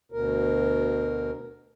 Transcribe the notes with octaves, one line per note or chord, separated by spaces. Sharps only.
D2 B2 A#4